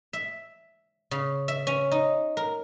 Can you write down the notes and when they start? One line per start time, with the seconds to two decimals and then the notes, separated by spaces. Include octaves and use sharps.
0.13 E5
1.11 C#3
1.48 E5
1.67 C#4
1.92 D#4
2.37 A#4